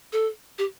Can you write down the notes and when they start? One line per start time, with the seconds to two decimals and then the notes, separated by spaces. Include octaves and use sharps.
0.13 A4
0.58 G4